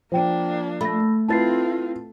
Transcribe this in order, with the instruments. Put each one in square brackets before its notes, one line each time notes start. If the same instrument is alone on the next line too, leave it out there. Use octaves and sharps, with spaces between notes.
[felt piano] F3 [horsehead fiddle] A#3 D4 [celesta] C5 G5
[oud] A3 [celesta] B5 A#6
[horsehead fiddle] C4 F4 [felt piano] E4 B4 [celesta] A5 A6 C7